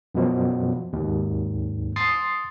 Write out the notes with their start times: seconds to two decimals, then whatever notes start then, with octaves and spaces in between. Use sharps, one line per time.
0.15 F#2 B2 F3
0.93 D#2 G#2
1.96 C6 D#6 A6 C7